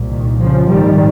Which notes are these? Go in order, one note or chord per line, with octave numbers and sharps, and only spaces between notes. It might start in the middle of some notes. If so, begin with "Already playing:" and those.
Already playing: C2 A#2
D#3
C#3 F3
A#1 G#2 D#3 G3